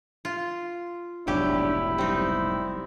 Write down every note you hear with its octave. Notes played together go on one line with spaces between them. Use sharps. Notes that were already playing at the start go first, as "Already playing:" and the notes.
F4
F1 B1 G#2 F#3 D4 E4 G4
G3 C4 D#4